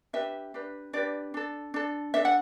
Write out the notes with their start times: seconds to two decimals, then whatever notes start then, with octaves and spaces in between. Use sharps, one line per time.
0.13 D4 G4 B4 E5
0.54 D4 G4 B4
0.93 D4 G4 B4 D5
1.34 D4 A4
1.74 D4 A4
2.14 D4 A4 E5
2.25 F#5